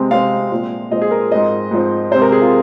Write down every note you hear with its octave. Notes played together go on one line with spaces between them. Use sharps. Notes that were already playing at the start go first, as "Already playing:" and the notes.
Already playing: C3 G#3 C4
C3 G#3 C4 F5
A#2 F3 G#3 C4
A#2 F3 G#3 C4 D#5
G#4
A#4
G#2 F3 C4 D#5
G#2 F3 C4
C3 G#3 C4 C5
A#4
G#4
F4